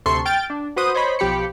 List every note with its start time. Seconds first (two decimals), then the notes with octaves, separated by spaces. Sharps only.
0.06 D2 C3 A4 C6 C#6
0.26 G5 F6 A6 D7
0.50 D4
0.76 F#4 B4 C5 D#6
0.94 C5 C#5 D#5 B5
1.19 B1 F3 G4 B5 C#7